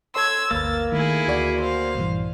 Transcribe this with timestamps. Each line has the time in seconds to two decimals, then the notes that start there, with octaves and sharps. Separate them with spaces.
0.15 A4 C#5 C6 E6 G#6
0.51 G1 D2 A#3 B4 E6 A6
0.92 D#3 A3 E4 G#4
1.27 D2 F#4 D5
1.60 C5 F5
1.95 A#1 G2 E3